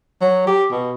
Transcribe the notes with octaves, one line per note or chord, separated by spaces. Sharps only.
F#3
G4
B2